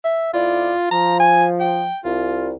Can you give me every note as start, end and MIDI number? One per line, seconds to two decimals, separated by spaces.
0.04 0.33 76
0.34 0.73 41
0.34 0.73 64
0.34 0.87 65
0.34 0.73 74
0.91 1.87 53
0.91 1.17 82
1.20 1.45 80
1.60 1.98 79
2.05 2.53 36
2.05 2.50 65